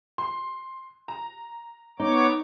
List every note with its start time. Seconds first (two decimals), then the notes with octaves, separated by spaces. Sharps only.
0.18 C6
1.08 A#5
2.00 B3 D#4 C#5 D6